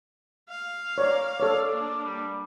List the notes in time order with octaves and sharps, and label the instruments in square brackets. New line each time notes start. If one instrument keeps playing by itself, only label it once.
[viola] F5
[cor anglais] A#3 [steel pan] C#5 D5
[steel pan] A4 C#5 [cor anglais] D5
[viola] A#3 D4
[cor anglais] G3